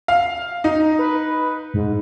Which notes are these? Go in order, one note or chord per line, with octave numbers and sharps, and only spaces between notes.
F5
D#4
B4
G#2